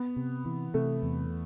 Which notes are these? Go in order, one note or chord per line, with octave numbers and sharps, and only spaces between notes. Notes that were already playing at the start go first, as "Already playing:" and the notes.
Already playing: B3
C3
E3
C3 A3
E2